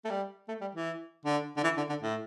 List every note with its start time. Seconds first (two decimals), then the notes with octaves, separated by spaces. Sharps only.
0.05 A3
0.10 G3
0.49 A3
0.61 G3
0.75 E3
1.26 D3
1.57 D3
1.64 E3
1.78 D3
1.89 D3
2.03 A2